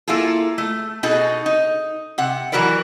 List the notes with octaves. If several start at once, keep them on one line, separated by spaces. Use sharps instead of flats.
A#3 E4 F4 G#4 A4
A3
B2 D#4 F#4 G#4 A4
D#4
C3 F#5
E3 F#3 F#4 A#4 B4 D5